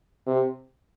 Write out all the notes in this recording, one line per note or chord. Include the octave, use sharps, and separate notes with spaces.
C3